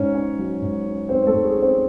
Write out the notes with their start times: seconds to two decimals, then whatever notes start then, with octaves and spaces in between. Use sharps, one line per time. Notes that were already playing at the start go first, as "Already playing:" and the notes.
Already playing: G#2 C#4 C#5
0.15 C#4
0.39 F#3
0.62 G#2
0.86 C#4
1.09 G#2 C4 C5
1.22 C5
1.27 A3 A4
1.33 G#2
1.44 G#4
1.57 C#4
1.62 C4 C5